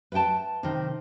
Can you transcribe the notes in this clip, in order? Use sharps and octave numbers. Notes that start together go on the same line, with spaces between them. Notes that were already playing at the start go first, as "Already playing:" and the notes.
B4 E5 F#5 G5 A5
C3 D#3